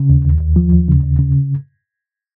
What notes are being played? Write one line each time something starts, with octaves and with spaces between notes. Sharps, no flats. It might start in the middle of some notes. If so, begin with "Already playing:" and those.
Already playing: C#3
D#2
D#2
D#2
F3
D#2
C#3
D#2
C#3